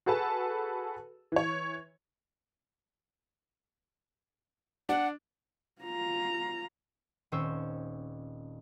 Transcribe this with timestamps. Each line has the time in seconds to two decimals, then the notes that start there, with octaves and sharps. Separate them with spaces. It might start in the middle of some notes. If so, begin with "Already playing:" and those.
0.06 F#4 G#4 A4 B4 A5
1.32 E3 C#5
4.89 D4 F#5
5.82 F4 A#5
7.32 D#1 C4 C#4 C5 C#6 E6